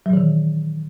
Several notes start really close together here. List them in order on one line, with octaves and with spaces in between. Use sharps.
F#3 A#2 E3 D#3